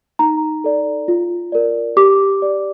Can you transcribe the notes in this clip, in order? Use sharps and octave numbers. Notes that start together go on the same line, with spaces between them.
D#4 A#5
A4 D5
F4
A#4 D5
G4 D6
D5